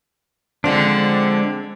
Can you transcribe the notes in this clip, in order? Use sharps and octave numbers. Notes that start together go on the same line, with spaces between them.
D3 F3 G#3 C4 D4